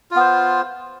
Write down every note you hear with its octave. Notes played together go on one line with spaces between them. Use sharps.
B3 F4 C5